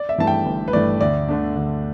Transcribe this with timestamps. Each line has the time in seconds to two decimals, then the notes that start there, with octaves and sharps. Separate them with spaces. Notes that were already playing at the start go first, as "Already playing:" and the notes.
Already playing: D5
0.09 E5
0.18 G2 E3 A3 A5
0.27 G5
0.46 G1
0.68 B4
0.73 G2 E3 A3 D5
1.01 D2 D5
1.29 D3 A3 D4
1.55 D2